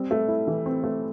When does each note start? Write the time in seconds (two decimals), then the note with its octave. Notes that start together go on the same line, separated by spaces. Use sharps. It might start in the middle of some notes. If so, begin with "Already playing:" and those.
Already playing: G3 C4
0.11 A3
0.28 E4
0.47 E3
0.66 C4
0.84 A3